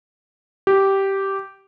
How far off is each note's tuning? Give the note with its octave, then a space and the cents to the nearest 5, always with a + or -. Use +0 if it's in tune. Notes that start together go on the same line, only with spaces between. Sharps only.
G4 -10